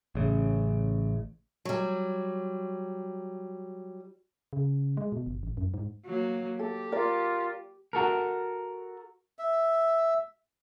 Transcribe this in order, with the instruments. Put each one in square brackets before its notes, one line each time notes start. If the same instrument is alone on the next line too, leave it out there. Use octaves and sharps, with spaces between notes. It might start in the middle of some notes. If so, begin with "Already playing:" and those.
[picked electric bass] A1 C#3
[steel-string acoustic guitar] F#3 G3
[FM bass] C#3
G#3
B2
G1
A1
F#2
G#2
[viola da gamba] F#3 A#3
[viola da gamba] G4 [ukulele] A4
[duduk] F4 [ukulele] A#4 D5
[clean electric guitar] F#4 A4 A#4
[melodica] E5